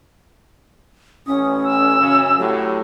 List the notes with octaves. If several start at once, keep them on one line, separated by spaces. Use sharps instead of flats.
A1 C#4 D#6
E6
F#2 C#3
A2 F#3 G4